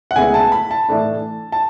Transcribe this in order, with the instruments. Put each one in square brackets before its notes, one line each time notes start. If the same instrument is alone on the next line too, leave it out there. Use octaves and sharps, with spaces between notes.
[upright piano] F#5
D2 C#3 G#3 B3 E4 G#5
A5
B5
A5
A2 E3 A3 D4
A5